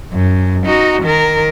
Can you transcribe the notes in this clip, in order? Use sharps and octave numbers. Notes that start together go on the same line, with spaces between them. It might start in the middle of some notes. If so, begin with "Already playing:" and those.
F#2
D#4 F#4
D#3 A#4